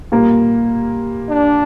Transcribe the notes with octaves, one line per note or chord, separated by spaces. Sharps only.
A#2 G3 A#3
D4